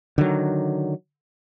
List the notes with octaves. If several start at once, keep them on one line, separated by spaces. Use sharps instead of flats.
D3 D#3 F#3